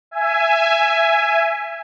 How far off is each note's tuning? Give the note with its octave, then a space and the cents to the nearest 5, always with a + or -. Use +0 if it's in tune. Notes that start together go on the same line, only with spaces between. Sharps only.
E5 +20 G#5 +0